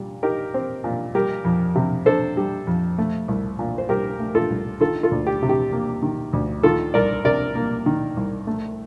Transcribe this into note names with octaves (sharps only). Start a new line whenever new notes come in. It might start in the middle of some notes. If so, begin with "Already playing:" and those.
Already playing: A#2 G3
D#4 G4 A#4
C4
A#2
G3 G4 A#4
F2
C3
D4 A4 C5
G3
F2
A3
C2
A#2
C5
C2 G4 A#4
A3
F4 A4
C2
D#3 F4 A4
F4 A4
D2
G4
C3
G4
A#3
D#3
D2
D#3 F4 A4
C2 A#4 D5
C3 A#4 D5
A#3
D#3
C2
A3